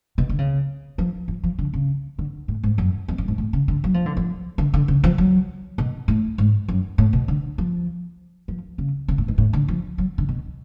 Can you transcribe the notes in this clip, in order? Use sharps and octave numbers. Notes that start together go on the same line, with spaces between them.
B2
D3
C#3
F3
F3
F3
D3
C#3
D3
A2
G#2
F#2
F2
F#2
G#2
A2
C#3
D3
F#3
F3
D3
F3
D3
D3
C#3
F3
F#3
B2
A2
G#2
F#2
A2
B2
D3
F3
F3
C#3
C#3
A2
G#2
A2
D3
F3
F#3
D3
B2